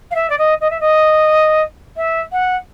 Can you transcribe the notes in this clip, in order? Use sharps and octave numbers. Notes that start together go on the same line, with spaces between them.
F5
E5
D5
D#5
D#5
E5
D#5
E5
F#5